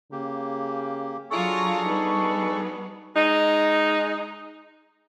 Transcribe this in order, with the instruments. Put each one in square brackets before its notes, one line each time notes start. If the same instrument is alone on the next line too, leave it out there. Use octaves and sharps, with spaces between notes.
[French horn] C#3 [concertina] A#3 G4
[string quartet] F#3 F4 A#5 [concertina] D4 G#4 A4 [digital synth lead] C#6
[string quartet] G3 B3 [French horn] D#4
[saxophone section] G#3 D#4